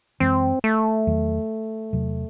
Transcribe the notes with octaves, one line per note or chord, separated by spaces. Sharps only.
F#2 E3 G#3 C4
A3
E2 D#3 F#3
E2 C3 F#3